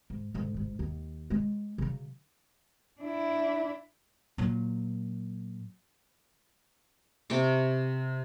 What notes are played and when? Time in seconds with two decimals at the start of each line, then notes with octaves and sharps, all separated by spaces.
0.10 G#2
0.34 G#2 D3
0.54 A1 G#2
0.79 D#2
1.30 G#3 C#4
1.78 C#3 F#3
3.01 D4 E4
4.38 A#2 F#3
7.30 C3 G5 C#6 D6